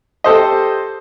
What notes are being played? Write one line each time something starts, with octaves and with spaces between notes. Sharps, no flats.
G4 A4 C5 D#5